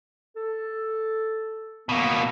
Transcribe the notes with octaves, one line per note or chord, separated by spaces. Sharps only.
A4
B2 A#3 B3